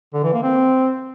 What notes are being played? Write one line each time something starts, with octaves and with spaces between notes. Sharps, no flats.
D3
E3
A#3
C4